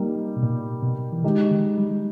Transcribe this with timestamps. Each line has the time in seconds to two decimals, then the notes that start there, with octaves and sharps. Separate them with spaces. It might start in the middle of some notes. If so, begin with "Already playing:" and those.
Already playing: G3 A#3 D#4
0.36 B2
0.43 A#2
0.82 B2
1.13 E3
1.24 D#3 G#3 D#4 G4
1.51 D#3
1.78 G3